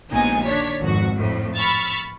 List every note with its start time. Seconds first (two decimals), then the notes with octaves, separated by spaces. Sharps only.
0.11 A#1 D#2 G#3 B3 D#4 G#5
0.45 D#3 D4 C#5 B6
0.81 G#1 F2 F#4
1.15 F2 A2
1.57 B5 C#6 E6 F6 A6